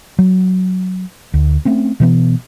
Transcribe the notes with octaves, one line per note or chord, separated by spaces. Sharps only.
F#3
D2
A3 C4 C#4
B2 E3 B3